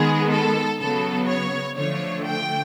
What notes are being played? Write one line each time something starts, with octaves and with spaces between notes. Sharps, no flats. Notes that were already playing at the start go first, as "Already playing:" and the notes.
Already playing: D#3 G#3 B3 G#4
A4
C#3 F#3 B3 A4
C#5
D3 F3 A3 C#5
G5